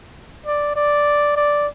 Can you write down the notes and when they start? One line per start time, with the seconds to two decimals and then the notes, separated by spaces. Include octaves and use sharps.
0.46 D5
0.76 D5
1.36 D5